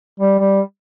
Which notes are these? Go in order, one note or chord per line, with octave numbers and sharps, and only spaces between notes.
G3
G3